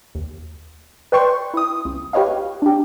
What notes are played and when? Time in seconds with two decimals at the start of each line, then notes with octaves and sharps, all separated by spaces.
0.15 D#2
1.12 B4 D5 G5 C6 C#6
1.54 E4 D#6
1.85 C#2
2.13 G4 B4 C#5 D#5 F5
2.62 D4 G4